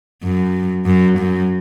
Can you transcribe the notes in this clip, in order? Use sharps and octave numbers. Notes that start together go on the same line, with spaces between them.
F#2
F#2
F#2